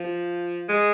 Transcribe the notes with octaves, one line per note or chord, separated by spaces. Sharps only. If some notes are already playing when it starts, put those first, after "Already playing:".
Already playing: F3
G#3